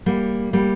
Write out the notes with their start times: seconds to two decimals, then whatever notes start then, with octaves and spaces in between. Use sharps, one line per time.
0.06 G3 A#3
0.53 G3 A#3